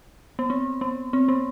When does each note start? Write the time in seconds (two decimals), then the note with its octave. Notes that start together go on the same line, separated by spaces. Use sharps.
0.39 B3
0.50 C4
0.81 B3
1.13 C4
1.28 B3